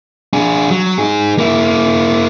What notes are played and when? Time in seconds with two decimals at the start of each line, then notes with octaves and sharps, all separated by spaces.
0.33 D4 G#4
0.71 F#3
0.98 D#4 G#4
1.38 A#3 E4